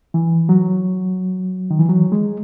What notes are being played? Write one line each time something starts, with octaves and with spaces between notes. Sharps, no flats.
E3
F#3
D#3
E3
F#3
G#3